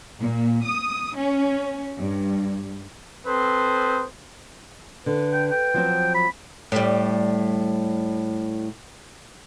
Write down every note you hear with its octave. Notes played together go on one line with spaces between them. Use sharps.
A#2
D#6
C#4
G2
C4 A4 B4 C5 D#6
D3 B4
G5
G5
F3 F#3 C4
B5
A2 G3